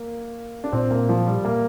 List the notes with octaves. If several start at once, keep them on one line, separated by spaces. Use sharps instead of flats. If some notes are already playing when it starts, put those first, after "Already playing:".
Already playing: A#3
D4
A#2 C4
A#3
F3
G3
A#3